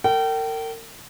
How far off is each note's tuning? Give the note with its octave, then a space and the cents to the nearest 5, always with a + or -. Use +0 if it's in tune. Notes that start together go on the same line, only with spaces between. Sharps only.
A#4 -40 G5 -30